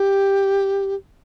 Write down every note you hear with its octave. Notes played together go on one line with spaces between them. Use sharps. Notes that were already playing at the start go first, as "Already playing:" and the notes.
Already playing: G4